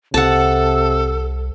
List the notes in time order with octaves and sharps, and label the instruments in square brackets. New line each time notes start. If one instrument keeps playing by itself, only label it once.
[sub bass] C2 [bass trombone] C3 [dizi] A4 [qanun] F#5 A5